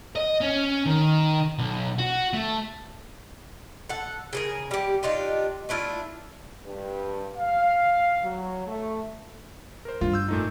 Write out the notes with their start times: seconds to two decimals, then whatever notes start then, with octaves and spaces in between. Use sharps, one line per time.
0.16 D#5
0.41 C#4
0.86 D#3
1.58 B1
1.99 F#4
2.33 A3
3.89 A4 F#5
4.33 C#3 G#4 A#4
4.71 G3 G4
5.03 D4 D#4 F4 G4
5.69 A3 D4 E4 F4
6.66 G2
7.36 F5
8.23 F#3
8.67 A3
9.85 A#4 C5
10.01 G2 F4
10.13 E6 G6
10.28 A#2 A3 D#4